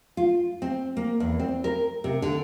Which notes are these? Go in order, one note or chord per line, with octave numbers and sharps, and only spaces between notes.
F4
C4
A#3
E2
C4
A#4
C3
D3